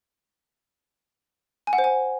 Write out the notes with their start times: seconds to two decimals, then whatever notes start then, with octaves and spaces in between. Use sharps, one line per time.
1.67 G#5
1.73 F#5
1.78 C5
1.84 G#5